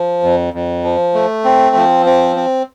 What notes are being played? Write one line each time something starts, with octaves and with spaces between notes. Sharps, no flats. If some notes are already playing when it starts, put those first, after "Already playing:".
Already playing: F3
F2
F2
F3
A3
C4
F3
C4
C4